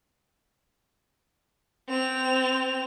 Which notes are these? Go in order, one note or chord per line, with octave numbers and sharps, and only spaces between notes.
C4 F7